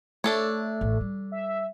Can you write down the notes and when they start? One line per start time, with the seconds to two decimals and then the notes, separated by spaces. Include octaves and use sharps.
0.24 A3 D4 A4 C#5
0.81 A1 D#3
1.01 G3
1.32 E5